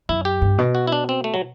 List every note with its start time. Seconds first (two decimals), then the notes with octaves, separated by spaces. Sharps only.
0.09 F#2 E4
0.25 G4
0.42 G2
0.58 B2
0.75 F#4
0.87 E4
0.92 D4
1.09 C4
1.24 A3
1.34 F#3